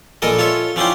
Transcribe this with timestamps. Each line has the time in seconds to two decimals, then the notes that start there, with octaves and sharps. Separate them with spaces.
0.22 A#1 G#3 A4 A#4 D#5
0.39 F4 A4 C#5 E5
0.76 F3 C#4 D4 E4 F4 G4